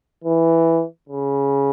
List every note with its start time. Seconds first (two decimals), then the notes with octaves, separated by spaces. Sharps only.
0.24 E3
1.09 C#3